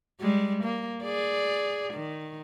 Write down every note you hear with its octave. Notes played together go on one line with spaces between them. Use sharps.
G3 G#3
A#3
G#4 D5
D#3